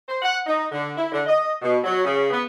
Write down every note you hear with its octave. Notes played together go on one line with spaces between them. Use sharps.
C5
F#5
D#4
D3
E4
D3
D#5
B2
F#3
C#3
B3